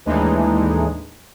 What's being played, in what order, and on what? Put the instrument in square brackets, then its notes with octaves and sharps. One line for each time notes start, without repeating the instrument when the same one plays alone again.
[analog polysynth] D#2 A2 E3 G#3 D4 D#4